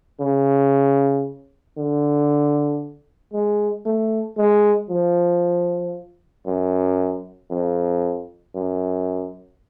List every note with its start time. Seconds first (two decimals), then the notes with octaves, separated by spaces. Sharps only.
0.20 C#3
1.77 D3
3.33 G#3
3.86 A3
4.37 G#3
4.90 F3
6.46 F#2
7.51 F2
8.55 F#2